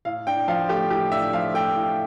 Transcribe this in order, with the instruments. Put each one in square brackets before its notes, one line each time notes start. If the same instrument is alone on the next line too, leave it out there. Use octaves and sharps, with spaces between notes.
[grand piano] A2 F5
D4 G5
F3 F5
A3 G4
A2 G4
D4 E5
F3 F5
A3 G5
A2